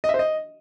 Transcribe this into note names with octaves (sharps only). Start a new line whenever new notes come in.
D#5
E5
C5
D#5